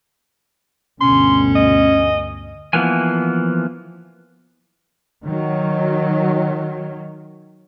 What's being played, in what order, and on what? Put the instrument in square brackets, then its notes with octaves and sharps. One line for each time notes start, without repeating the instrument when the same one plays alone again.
[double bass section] D2 G2 B2 [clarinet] C#4 [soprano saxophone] C6
[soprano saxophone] D#5
[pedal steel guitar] E3 F3 A#3 B3 G#5
[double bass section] D#3 F#3